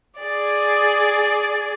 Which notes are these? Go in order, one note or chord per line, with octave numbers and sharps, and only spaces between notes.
G#4 D5